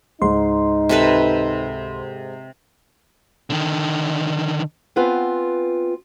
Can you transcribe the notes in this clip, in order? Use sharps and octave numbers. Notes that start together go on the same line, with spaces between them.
C#2 G#2 D#4 C6
C3 A4 B4
D3 D#3
B3 C4 F4 B4 G#5